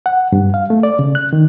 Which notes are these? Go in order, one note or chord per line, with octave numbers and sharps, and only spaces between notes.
F#5
G2
F5
A3
D5
C#3
F#6
D#3